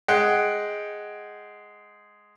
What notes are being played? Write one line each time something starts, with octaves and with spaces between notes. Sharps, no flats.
G#3 F#5 G5 F#6